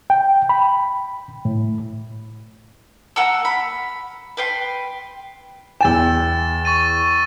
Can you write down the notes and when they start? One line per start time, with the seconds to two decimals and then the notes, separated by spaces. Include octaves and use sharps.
0.10 G5
0.49 B5
1.45 A2
3.16 A#3 F#5 A#5 E6
3.45 B5
4.37 B4 G5 C6
5.81 E2 G5 E6 A6 E7
6.65 C#6 A6 D#7